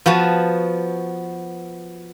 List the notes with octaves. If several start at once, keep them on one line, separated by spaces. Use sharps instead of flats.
F3 B3 F#4 A5